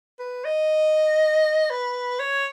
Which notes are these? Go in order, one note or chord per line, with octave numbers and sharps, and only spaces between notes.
B4
D#5
B4
C#5